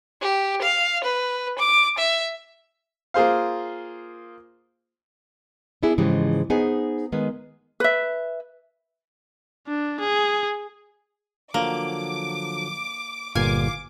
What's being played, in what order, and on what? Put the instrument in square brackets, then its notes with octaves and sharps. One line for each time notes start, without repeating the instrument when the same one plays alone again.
[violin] G4
F5
B4
D6
E5
[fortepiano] A#3 F4 G#4 C5 F5
[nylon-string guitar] B3 D4 E4 G#4
G#2 C#3 E3 F3 G#3 G4
B3 D#4 G#4 C5 D#5 G#5
D#3 G#3 B3
[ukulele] B4 E5
[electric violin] D4
G#4
[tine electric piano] D3 F3 F#3 [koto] A#3 [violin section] D6
[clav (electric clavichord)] G1 A#2 [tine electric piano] F5 C7 [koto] G#5 [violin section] D6